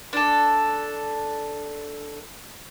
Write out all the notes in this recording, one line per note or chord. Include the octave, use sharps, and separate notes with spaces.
D4 A4